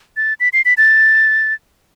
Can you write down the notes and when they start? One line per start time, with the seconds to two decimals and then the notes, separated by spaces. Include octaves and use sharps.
0.17 A6
0.40 B6
0.53 C7
0.65 B6
0.77 A6